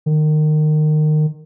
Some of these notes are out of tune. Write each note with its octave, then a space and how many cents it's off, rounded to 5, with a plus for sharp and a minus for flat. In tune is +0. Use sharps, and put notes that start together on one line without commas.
D#3 -25